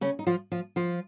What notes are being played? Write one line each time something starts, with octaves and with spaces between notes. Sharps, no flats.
C#3 C#4
D#4
F3 F4
F3 F4
F3 F4